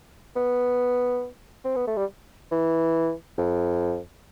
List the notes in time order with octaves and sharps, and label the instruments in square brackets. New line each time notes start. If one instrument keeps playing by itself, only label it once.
[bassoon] B3
C4
B3
A3
G3
E3
F2